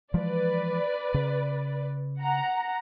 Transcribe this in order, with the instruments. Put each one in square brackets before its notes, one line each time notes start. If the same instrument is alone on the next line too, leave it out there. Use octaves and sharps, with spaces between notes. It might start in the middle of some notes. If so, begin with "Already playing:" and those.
[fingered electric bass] E3 F3 G#3 [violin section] B4 D5
[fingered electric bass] C#3
[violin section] F#5 A#5